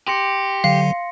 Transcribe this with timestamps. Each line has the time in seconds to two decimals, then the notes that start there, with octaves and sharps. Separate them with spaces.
0.08 G4 C6 A#6 C#7
0.64 D3 F#3 F5